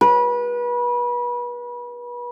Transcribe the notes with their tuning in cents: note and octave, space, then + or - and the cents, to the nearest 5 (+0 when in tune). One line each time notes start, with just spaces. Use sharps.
B4 -30